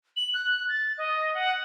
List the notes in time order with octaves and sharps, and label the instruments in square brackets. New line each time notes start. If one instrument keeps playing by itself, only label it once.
[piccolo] F#7
F#6
A6
D#5
F#5